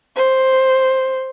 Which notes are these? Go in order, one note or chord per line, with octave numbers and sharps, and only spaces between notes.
C5